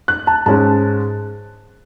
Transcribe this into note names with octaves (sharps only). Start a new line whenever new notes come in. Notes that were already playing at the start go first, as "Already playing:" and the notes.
F#6
A5
G#2 G#3 C#4 A5